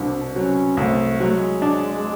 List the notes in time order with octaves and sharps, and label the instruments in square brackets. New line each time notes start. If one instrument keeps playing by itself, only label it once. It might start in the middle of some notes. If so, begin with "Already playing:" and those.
Already playing: [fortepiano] C2 B2 [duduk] D4
[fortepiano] F#3 [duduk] C#4
[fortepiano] C2 [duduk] A3
[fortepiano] F#3 [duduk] G#3
[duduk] A3
G#3
[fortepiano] D4